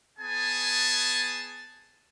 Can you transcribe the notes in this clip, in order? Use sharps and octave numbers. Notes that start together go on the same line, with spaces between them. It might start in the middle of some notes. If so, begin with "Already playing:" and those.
B3 G#4 G#5 A5